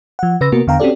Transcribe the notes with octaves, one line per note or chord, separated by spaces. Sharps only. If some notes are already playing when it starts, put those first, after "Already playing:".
F3 F#5
C#3 B4 E6 A#6
C3 A#3 B3 F#4 A#4
E2 D3 B3 F5 G5 A#5
C4 C#4 F#4 G4 A4 D5